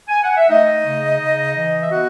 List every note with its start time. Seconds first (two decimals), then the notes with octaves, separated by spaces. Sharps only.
0.09 G#5
0.23 F#5
0.37 E5
0.49 A3 D#4 D#5
0.85 C#3
1.19 C#3
1.54 E3
1.81 E5
1.89 B3 F#4 F#5